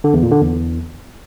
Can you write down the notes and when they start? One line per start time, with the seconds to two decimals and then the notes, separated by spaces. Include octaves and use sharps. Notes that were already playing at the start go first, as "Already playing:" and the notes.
0.04 D3
0.13 E2
0.22 A#2
0.32 D3
0.41 E2